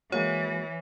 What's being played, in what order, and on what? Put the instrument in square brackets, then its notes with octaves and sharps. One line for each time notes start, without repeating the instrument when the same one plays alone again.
[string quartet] E3 [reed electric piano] G#3 A#3 F#4 [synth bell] C#5